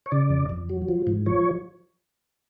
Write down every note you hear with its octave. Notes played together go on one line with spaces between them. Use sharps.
C#5
C#3 D5
F2
F2
F#3
F3
G#2
F3 C#5